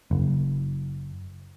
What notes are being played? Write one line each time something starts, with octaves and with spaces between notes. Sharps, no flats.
F#1